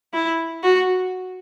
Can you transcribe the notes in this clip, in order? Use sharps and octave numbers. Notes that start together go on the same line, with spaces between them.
E4
F#4